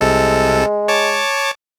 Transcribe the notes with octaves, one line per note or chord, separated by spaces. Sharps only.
C2 C3 G#3 A4
C#5 A5 D6